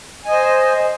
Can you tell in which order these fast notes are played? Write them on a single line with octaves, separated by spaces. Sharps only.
G#5 D#5 C5